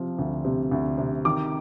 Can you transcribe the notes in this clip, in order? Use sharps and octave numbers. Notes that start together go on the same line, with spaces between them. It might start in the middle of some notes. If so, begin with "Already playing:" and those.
Already playing: C3 F3
D2
C3
D2
C3
D#3 D6